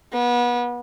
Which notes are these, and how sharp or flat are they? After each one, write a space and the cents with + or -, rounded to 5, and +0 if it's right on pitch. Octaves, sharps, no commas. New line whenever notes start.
B3 -30